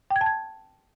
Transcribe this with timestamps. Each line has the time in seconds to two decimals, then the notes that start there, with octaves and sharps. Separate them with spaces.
0.10 G5
0.16 G#6
0.21 A5
0.26 G#6